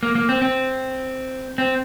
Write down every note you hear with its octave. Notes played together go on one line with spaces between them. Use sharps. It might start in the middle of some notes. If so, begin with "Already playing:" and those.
A#3
A#3
C4
C4
C4